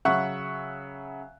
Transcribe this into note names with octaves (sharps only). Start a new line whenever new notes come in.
C#3 F#3 E5 F#5 C#6 F#6